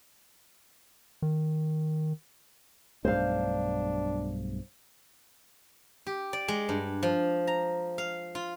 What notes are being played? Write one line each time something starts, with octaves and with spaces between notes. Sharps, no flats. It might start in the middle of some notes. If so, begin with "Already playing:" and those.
D#3
B1 G2 A3 D4 C5 F5
G4
D5
G#3
G2
F3
A#5
F5
F4